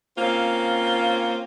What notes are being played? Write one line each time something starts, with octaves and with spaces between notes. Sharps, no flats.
A#3 C4 C#4 F4